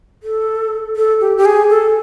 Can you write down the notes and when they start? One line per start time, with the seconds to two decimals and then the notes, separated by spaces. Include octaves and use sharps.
0.23 A4
0.96 A4
1.21 G4
1.37 G4
1.45 G#4
1.70 A4